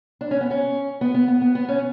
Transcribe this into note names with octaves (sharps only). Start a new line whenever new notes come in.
D4
C#4
B3
C#4
B3
B3
B3
B3
B3
C#4